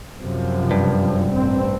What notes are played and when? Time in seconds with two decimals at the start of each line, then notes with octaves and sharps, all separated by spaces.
0.20 F#2 C3 F3
0.71 G2
1.31 A1 C4